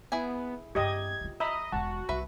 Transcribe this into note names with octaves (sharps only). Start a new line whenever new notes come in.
B3 E4 G#4 G#5
G2 C4 G4 D#5 G#6
C#4 F4
D#5 E5 A#5 B5
E1 F#4 A5
C2 B4 E5